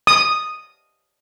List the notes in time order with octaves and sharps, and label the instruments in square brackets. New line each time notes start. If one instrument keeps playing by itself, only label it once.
[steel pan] D#6